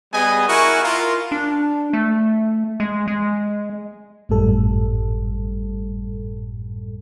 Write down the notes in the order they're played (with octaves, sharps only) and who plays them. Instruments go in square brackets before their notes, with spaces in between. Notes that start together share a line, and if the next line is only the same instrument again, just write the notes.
[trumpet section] G3 B3 G#4 D#5 G#5
E4 F#4 A#4 G#5 C#6
F4 A#4
[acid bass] D4
A3
G#3
G#3
[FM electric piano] G#1 F#2 A2 G3 A4